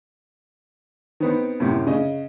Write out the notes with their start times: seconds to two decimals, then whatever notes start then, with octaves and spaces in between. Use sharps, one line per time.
1.20 D#3 B3 C4
1.60 F#2 A2 C3
1.87 C#3 D#5